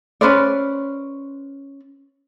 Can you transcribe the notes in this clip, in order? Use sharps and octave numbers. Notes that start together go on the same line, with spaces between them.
C#4 B4 C5 D5